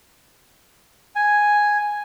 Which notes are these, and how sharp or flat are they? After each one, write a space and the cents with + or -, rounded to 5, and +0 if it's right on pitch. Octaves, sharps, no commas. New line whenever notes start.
G#5 +0